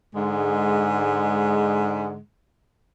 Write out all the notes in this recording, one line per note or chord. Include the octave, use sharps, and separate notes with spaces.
G#2 D3 G#3